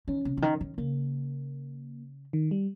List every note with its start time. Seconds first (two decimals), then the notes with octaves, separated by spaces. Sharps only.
0.08 D#3 C#4
0.25 C3
0.37 C#3
0.42 D#3
0.61 D#3
0.78 C#3 A#3
2.33 D#3
2.51 G3